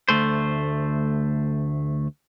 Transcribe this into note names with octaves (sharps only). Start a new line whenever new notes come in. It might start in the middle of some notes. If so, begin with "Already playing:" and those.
D2 A3 C5